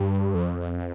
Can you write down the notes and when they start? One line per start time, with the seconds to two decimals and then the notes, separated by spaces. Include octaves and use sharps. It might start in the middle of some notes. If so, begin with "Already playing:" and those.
Already playing: G2
0.34 F2